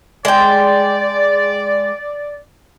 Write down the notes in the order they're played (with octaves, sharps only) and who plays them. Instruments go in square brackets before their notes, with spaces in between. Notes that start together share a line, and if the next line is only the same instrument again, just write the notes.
[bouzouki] G#3 G5 [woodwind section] D5